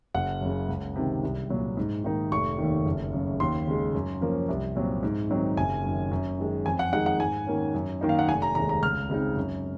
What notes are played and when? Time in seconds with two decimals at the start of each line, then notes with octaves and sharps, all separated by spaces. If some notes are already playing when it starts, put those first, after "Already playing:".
0.15 F#1 F#5
0.41 F#2 C#3
0.69 C#2
0.96 C3 D#3
1.23 C2
1.50 A#2 F#3
1.77 G#2
2.04 D#3 A#3 D#4
2.32 F1 C#6
2.58 D#2 D#3
2.86 F#1
3.13 F#2 C#3
3.40 D#2 C6
3.67 C#3 G#3
3.94 F#2
4.21 F3 A#3 C#4
4.48 C2
4.76 A#2 F#3 C4
5.03 G#2
5.29 D#3 F#3 C4 D#4
5.57 F#1 G#5
5.84 F#2 D#3
6.11 F#2
6.39 D#3 G#3
6.65 F2 G#5
6.79 F#5
6.93 D#3 G#3 D#4 F#5
7.06 F#5
7.19 G#2 G#5
7.47 D#3 A#3 C#4
7.74 F#2
8.01 D#3 A#3 D#4
8.09 F5
8.19 F#5
8.28 F1 G#5
8.42 A#5
8.55 D#2 D#3 G#3 A#5
8.69 A#5
8.82 C#2 F6
9.10 C#3 G#3 C4 D#4
9.37 F#2